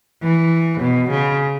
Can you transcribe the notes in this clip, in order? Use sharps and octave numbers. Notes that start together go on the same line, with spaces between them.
E3
B2
C#3